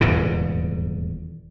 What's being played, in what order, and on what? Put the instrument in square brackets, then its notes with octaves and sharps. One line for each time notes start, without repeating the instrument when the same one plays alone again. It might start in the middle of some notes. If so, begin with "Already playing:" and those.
[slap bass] D#1 E2 G#2 C#3